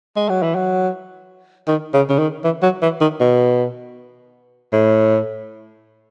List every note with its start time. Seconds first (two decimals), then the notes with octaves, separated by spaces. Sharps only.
0.16 G#3
0.29 F#3
0.42 E3
0.55 F#3
1.68 D#3
1.93 C#3
2.10 C#3
2.19 D#3
2.44 E3
2.63 F#3
2.82 E3
3.01 D#3
3.20 B2
4.72 A2